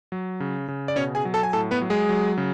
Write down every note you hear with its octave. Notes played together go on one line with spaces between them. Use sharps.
F#3
C#3
C#3
D5
B2 C#4 C#5
G#4 G#5
F#3
A4 A5
G#5
A2 A4 A5
B3 B4
F#3
G#3 G#4
F#3
C#3